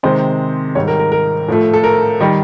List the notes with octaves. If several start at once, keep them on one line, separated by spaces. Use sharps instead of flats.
C3 D#3 G#3 C5
G#2 D#3 G3 C#5
A#4
A#4
A#4
A2 F3 A3
A4
A#4
D#3 G3